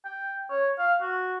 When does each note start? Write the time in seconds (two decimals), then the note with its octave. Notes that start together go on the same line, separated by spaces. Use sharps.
0.05 G5
0.50 C#5
0.79 F5
1.01 F#4